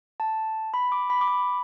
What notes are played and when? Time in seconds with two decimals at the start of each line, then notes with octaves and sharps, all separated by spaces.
0.20 A5
0.74 B5
0.92 D6
1.10 B5
1.21 D6
1.28 B5